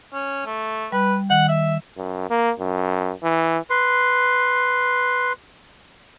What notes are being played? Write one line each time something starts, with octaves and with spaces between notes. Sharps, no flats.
C#4
A3
G3 B4
D#3 F#5
E5
F#2
A#3
F#2
E3
B4 C6